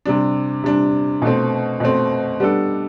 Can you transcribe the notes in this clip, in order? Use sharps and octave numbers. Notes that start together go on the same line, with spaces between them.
C3 G3 D4
C3 G3 D4
B2 A3 C4
B2 A3 C4
G3 B3 D4 A4